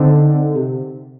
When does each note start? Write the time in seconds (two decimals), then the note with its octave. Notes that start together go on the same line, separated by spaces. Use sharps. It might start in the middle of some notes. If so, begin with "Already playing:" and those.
Already playing: D3 C4 D#4
0.56 C3